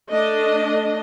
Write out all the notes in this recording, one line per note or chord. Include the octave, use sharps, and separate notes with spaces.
A3 D4 D#5